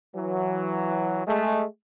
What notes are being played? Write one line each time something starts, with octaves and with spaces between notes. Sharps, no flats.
E3 F#3
G#3 A3